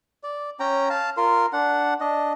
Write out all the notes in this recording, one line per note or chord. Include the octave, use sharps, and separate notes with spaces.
D5
C#4 G5 A#5
F5 A5
F4 A#4 C6
D4 F#5
D4 D#5